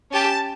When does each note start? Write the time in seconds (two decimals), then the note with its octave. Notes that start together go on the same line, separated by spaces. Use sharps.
0.11 C#4 G4 A5